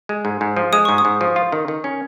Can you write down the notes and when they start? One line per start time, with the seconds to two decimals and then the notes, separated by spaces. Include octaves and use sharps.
0.09 G#3
0.25 G#2
0.41 G#2
0.57 F3
0.73 G#3 D#6
0.85 G#2 C#6
0.98 D#6
1.05 G#2
1.21 F3
1.36 F4
1.52 D#3
1.68 D#3
1.84 C#4